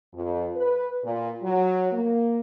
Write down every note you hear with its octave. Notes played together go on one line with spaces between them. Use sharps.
F2
B4
A#2
F#3
A#3